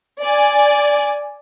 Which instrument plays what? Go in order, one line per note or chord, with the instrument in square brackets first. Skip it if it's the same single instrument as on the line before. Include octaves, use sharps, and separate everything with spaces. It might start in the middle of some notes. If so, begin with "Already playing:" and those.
[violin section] D5 G#5